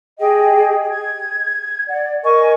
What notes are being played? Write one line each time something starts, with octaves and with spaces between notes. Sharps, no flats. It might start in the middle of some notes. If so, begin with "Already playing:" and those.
G4 G#4 D#5 G5
G#6
D5 F#5
A#4 D#5 G#5 C#6